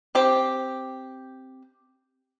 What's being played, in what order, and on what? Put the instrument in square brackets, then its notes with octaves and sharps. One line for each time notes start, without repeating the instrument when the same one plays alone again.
[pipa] C4 G4